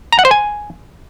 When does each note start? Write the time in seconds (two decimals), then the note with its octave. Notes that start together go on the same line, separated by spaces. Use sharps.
0.12 A#5
0.19 F#5
0.25 C5
0.31 G#5